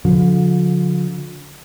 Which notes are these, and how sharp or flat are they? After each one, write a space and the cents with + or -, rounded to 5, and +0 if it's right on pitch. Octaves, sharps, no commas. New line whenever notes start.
D3 -30 F3 +40